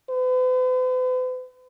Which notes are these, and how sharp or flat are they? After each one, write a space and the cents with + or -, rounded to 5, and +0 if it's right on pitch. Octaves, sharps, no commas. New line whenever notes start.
B4 +45